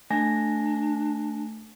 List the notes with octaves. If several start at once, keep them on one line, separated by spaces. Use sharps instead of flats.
A3 D4 G#5 A#6